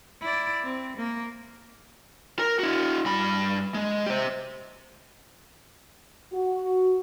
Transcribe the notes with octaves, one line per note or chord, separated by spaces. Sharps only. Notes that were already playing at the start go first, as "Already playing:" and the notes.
E4 D5
C4
A#3
A#4
E4 F#4
G2 B5
G#3
G4 C5
F#4